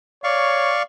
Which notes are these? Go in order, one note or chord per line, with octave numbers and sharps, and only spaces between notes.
C#5 D5 F5 C#6